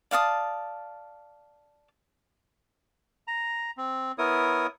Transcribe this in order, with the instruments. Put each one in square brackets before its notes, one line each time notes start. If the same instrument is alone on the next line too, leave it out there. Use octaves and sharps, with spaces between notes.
[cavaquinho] D5 F5 A5 D#6
[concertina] A#5
C4
B3 E4 A#4 C#5 D#6